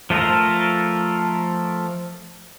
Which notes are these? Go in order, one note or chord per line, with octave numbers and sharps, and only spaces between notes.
F3 A3 F4 A4 A#4